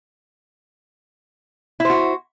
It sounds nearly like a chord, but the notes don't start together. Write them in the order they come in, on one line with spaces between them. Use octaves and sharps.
E4 C5 F#4